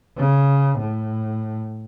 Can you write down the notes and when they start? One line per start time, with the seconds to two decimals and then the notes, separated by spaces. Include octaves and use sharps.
0.18 C#3
0.79 A2